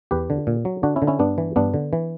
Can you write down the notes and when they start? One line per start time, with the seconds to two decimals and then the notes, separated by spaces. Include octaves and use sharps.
0.11 E2 G4 B4
0.30 D3
0.47 A#2
0.65 F#3
0.83 D3 D4 F#4
0.96 C#4 E4
1.02 D3
1.07 C#4 E4
1.19 G2 B3 D4
1.38 E3
1.56 G2 B3 D4
1.74 D3
1.93 E3